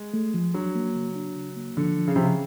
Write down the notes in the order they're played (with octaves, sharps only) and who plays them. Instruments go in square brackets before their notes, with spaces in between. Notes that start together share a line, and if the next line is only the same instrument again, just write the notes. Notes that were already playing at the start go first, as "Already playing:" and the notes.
Already playing: [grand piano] G#3
[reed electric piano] A3
F3
[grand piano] F#3 [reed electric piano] D4
[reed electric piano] A#3
C#3
D4
C#3
A#3
[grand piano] D3 [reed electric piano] F3
[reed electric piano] F3
[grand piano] C#3
[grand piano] C3 [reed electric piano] F3
[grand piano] C#3